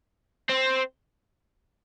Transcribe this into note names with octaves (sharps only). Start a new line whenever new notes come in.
C4